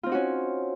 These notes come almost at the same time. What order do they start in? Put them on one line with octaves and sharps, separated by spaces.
F4 C4 D#4 F#4 C#4